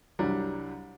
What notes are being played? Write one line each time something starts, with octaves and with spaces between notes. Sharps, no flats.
C2 F#3 G3 D4 A#5